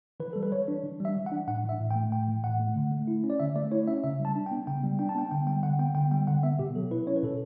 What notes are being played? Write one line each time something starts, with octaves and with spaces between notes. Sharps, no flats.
E3 B4
G3 A4
B4
E3 C#5
D4
E3
G3 E5
E3
F#5
D4
A2 F#5
E3
E5
A2
G5
A3
A2 G5
E3
A2 F#5
A3
D3
A3
E4
C#4
D5
D3 E5
A3 D5
E4 C#5
C#4 E5
C#3 E5
G3
A5
D4
G5
B3
C#3 G5
G3
D4 G5
A5
B3 G5
D3 G5
G3 G5
D3 F#5
B3 G5
D3 G5
G3 G5
D3 F#5
B3 E5
B2 G4
F#3 A4
E4 B4
C#4 C#5
B4
B2 A4